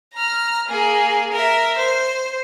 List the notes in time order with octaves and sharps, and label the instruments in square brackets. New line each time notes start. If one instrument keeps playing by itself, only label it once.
[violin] A#5 F6
A#3 G#4
A#4 E5
C5